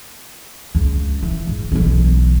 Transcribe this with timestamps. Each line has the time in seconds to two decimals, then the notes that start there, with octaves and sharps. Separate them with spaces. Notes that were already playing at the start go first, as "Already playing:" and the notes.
0.75 C#2 F3
1.23 E3
1.47 G#2
1.72 B1 E3